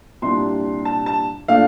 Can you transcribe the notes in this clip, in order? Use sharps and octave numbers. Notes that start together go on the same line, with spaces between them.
C2 A#2 G3 D4 C6
A5
A5
A#2 A3 D4 F5